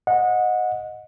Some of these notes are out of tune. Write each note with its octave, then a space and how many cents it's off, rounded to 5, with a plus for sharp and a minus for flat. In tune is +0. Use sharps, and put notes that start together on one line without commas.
D#5 +0 F#5 -25